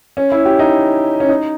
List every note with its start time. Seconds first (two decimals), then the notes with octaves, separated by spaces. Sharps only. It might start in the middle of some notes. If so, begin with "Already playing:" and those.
0.17 C#4
0.32 E4
0.45 G4
0.59 D#4
1.20 C#4
1.29 D#4